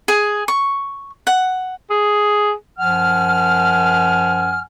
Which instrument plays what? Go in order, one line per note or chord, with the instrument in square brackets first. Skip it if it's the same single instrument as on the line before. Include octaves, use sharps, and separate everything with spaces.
[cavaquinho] G#4
C#6
F#5
[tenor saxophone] G#4
[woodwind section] F#2 F3 F#5 G#5 F6